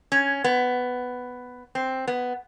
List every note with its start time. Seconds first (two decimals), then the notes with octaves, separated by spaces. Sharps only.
0.12 C#4
0.44 B3
1.75 C4
2.07 B3